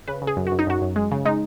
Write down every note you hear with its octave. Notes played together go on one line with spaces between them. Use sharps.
C#3 B4
C#3
G#4
F#2
F#4
F#2
D#4
F#2 F#4
F#2
G#3
C#3
G#3 D#4